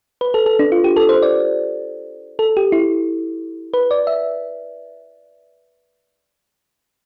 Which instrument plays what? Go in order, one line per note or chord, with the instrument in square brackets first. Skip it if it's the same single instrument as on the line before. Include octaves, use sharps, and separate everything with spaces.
[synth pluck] B4
A4
A4
D4
F4
G4
A4
C5
D5
A4
G4
E4
B4
D5
E5